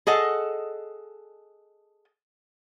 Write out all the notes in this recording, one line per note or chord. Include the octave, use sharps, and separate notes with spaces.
G#4 A4 D#5 F#5